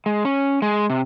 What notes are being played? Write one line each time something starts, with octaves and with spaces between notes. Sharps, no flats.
G#3
C#4
G#3
C3